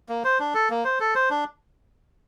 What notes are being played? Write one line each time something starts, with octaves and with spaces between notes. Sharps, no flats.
A#3
C5
D4
A4
A#3
C5
A4
C5
D4